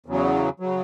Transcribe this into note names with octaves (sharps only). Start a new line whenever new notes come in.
E2 C#3 F#3
C#3 F#3